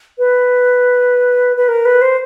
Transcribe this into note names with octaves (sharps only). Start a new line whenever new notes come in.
B4
B4
A#4
B4
C5